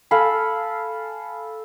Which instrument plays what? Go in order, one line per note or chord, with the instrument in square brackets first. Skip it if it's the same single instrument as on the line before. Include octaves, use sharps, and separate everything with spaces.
[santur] A4 F5 G#5 B5